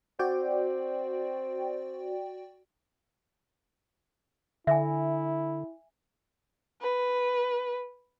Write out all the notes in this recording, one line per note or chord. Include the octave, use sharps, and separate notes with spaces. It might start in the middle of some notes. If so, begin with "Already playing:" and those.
C4 F#4 D5 G5
D3 E4 E5 G#5
B4